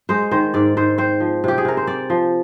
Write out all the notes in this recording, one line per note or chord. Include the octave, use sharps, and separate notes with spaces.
G#3 C5
D#3 C5
G#2 D5
G#2 C5
C4 C5
F3
C3 G4
G#4
C3 A#4
C5
C4 D5
F3